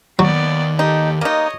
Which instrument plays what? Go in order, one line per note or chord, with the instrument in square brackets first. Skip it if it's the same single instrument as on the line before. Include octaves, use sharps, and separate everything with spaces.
[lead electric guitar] D#2 [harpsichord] F#3 [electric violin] B3 D5
[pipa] D#4 [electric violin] G4 A4
[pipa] A#3 D#4 [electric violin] C#5 D#5